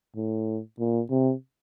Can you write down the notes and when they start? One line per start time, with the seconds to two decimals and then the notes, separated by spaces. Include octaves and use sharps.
0.16 A2
0.80 A#2
1.10 C3